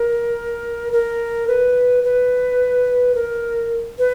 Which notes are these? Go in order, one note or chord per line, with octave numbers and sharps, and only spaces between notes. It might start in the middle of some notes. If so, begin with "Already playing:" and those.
Already playing: A#4
A#4
B4
B4
A#4
B4